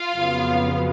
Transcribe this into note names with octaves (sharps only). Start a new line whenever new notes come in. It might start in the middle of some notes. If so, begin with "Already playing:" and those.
Already playing: F4 F5
F2 C#3 F#3 B3